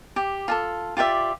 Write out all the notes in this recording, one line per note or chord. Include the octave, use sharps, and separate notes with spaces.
G4
F4 G#4 A4
F4 G4 D5 E5